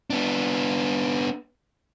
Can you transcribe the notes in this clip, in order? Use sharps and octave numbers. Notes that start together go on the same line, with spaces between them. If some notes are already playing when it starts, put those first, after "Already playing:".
B3 D4